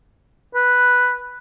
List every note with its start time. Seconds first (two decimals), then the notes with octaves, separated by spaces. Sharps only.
0.55 B4